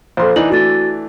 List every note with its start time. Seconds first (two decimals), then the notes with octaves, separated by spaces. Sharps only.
0.17 A#1 A4 C5 C6
0.36 E3 D4 D#4 F#7
0.50 E3 A3 D4 F#4 A6